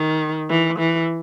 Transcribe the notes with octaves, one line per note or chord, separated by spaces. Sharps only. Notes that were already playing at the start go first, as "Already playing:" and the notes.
Already playing: D#3
E3
E3